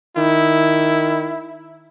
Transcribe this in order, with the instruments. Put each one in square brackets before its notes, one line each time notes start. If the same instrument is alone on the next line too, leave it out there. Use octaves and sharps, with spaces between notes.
[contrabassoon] D#3 [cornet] E4